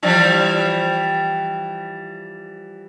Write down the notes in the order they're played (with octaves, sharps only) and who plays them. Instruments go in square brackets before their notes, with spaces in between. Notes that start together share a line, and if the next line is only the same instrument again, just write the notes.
[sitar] E3 F3 G3